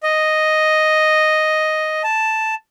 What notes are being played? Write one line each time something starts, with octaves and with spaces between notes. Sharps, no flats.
D#5
A5